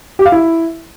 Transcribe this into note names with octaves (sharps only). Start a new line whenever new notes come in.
G4
F5
E4